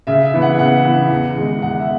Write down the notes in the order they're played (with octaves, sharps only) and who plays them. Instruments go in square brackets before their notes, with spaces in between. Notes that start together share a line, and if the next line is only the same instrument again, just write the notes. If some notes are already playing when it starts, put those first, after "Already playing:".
[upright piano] C#3 E5
E5
E3 B3
F#5
C#3 F#5
E3 B3
E2
D#3 G#3 D#4
E2 F#5
E5